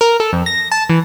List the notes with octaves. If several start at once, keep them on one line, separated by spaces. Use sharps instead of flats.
A#4
A4
F2
A#6
A5
E3